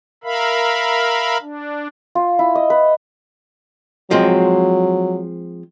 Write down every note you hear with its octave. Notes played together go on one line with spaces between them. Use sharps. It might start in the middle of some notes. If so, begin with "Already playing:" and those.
A#4 E5 F5 B5
D4
F4
E4
D#5
B4
F3 F#3 G#3 C4